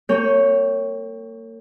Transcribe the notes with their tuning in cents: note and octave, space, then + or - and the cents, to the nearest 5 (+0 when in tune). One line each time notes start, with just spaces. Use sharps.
A#3 -40 C#5 +0 G5 +0